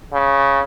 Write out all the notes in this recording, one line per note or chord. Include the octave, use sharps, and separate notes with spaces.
C#3